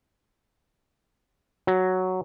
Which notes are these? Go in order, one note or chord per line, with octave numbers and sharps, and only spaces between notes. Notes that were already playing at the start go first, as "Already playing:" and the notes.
F#3